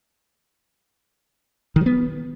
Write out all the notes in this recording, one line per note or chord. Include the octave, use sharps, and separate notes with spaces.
D#3
F#3
B3